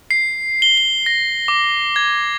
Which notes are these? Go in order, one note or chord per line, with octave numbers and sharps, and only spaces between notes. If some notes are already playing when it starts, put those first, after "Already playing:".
C7
G7
G7
A#6
D6
G#6